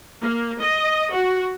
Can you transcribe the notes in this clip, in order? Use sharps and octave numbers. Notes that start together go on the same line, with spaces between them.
A#3
D#5
F#4